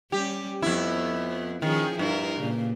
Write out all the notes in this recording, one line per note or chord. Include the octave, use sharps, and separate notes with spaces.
G3 C#4 G4
F2 B3 E4
D#3 F3 C#4 G#4
G2 E4 A#4
A#2 C#3